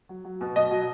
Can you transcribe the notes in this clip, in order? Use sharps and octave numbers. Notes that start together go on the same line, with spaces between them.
F#3
F#3
B2
B2 D#5
F#3